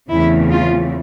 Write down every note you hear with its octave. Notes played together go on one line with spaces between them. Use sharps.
E2 C#3 E3 A3 C4 E4
F4